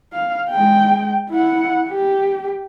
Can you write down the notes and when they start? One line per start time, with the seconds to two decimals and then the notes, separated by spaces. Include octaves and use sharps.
0.13 F5
0.49 G#3 G5
1.30 E4 F#5
1.89 G4